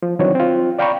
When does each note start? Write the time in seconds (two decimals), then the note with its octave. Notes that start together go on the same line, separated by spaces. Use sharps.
0.03 F3
0.19 D#3 E3 F#3 C4 D4 C#5
0.35 C4 F4
0.79 D5 F5 G5 A#5 B5 C#6